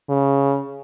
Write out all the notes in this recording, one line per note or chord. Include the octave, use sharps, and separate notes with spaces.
C#3